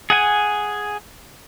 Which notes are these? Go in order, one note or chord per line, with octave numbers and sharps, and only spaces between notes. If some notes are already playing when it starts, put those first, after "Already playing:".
G#4 F#5 G#5